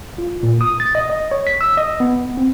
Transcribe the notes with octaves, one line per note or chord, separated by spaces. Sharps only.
F4
A#2
D#6
A6
D#5
D#5
C#5
B6
E6
D#5
B3
C4